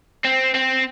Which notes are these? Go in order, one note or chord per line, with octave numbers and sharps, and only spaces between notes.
C4
C4